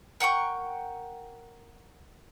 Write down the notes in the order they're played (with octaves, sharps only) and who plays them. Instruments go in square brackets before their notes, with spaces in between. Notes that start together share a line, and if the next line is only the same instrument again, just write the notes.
[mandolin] A#4 F#5 G5 C#6